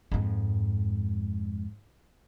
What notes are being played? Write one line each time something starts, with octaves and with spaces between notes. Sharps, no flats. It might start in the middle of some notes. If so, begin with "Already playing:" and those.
F2 G#2